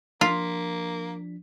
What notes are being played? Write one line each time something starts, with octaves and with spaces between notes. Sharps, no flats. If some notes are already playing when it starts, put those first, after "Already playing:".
F3 A#3 D4 F4 B6